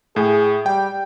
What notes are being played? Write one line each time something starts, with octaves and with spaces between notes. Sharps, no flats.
A2 G#4
G3 G5